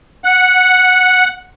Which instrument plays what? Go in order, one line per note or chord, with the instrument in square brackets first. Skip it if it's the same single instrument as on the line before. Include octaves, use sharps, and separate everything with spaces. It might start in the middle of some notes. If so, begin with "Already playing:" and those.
[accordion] F#5